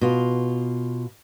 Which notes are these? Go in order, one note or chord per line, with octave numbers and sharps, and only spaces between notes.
B2 F4